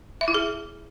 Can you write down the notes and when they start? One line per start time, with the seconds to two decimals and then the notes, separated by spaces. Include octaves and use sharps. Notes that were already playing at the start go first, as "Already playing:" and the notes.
0.21 E5
0.28 E4
0.34 G#4